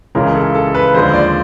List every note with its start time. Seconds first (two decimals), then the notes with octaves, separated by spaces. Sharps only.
0.15 C#2 C#3 E3 G#3 A#4
0.35 A4
0.55 A4
0.75 B4
0.94 D#2 D3 F3 G#3 C5
1.14 D5